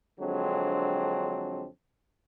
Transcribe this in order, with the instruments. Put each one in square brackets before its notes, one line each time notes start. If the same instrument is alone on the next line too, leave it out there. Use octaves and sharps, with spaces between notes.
[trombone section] F2 D3 F#3 G#3 C4 D4